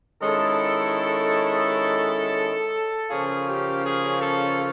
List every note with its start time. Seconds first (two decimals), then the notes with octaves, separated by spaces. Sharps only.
0.22 D#3 G#3 C#4 E4 A4
3.11 C#3 F3 A#3 C#4 F4 G#4
3.47 G4
3.84 G#4
4.19 A4